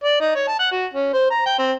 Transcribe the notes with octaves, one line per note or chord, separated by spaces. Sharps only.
D5
D#4
C#5
A5
F#5
F#4
C#4
C5
A#5
G5
C4